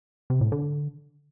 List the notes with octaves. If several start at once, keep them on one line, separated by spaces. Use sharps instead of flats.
C3
A2
D3